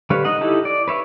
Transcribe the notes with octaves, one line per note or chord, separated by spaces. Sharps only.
D3 G3 B4 C#5 F5
D#4 D#5 F#5
D#4 E4 G4 A4
D5
B4 C#5 E5